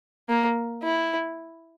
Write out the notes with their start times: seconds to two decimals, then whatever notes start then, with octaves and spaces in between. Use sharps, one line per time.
0.29 A#3
0.83 E4